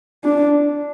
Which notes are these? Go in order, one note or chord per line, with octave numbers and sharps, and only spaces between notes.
D4